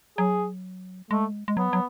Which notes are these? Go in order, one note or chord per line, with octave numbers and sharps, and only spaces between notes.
F#3 G#4
G#3 A3
G#3
F#3 B3
F#3